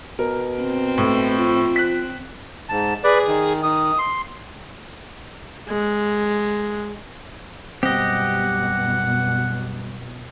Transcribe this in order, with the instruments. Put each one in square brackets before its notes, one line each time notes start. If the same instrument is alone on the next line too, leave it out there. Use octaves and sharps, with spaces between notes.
[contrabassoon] B2 [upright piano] A#4
[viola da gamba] C4
[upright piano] A2
[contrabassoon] F3
[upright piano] F#6 B6
[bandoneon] G#2 A5
[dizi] G#4 [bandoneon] B4 D5
[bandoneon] D#3
[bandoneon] D#3 [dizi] D#6
[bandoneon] C6
[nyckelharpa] G#3
[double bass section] F#2 B2 [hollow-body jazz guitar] G3 C4 [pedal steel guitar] G4 D#5 [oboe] F#5